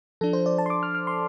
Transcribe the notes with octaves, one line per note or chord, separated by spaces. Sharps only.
F3 D4 A4
C5
D5
A5
C6
D6
F6
F6
C6